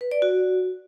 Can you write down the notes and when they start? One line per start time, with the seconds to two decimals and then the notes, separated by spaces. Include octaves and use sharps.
0.01 B4
0.11 D5
0.22 F#4